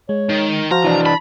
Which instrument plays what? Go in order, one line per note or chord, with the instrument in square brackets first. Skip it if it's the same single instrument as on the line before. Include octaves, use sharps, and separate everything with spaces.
[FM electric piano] G#3 [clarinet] C#5
[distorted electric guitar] D#3
[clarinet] F3 [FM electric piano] F#4 C5 F5 [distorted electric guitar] A#5
[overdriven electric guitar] E3 D4
[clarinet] A5 [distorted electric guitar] B5